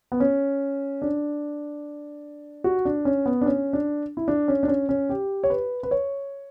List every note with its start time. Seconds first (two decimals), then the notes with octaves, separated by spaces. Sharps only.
0.12 B3
0.20 C#4
1.02 D4
2.64 F#4
2.85 D4
3.05 C#4
3.26 B3
3.41 D4
3.46 C#4
3.73 D4
4.17 E4
4.28 D4
4.48 C#4
4.63 D4
4.68 C#4
4.89 C#4
5.09 G4
5.44 C#5
5.50 B4
5.83 B4
5.91 C#5